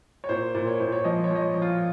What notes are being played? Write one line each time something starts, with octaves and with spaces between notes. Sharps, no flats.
C#5
A#2 C5
A#2
C#5
A#2 C5
C#5
F3 D#5
C#5
F3 D#5
C#5
F3
F4